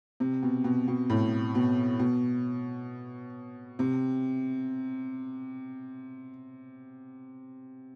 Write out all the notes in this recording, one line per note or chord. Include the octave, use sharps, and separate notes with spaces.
C3
B2
B2
B2
A2
B2
B2
C3